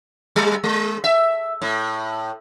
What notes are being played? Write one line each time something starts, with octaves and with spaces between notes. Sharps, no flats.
G3
G#3
E5
A2